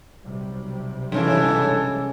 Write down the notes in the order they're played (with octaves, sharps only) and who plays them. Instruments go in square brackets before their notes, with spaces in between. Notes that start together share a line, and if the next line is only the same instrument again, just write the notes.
[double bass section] B1 C3 G3
[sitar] G2 C#3 E3 [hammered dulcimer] G#3 C#4 C#5 [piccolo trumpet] A4